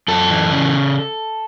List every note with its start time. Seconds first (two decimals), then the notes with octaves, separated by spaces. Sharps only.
0.08 F#2 A4
0.30 E3
0.51 C#3